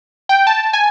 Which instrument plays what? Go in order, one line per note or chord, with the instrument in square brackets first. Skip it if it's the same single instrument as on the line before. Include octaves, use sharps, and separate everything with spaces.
[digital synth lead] G5
A5
G#5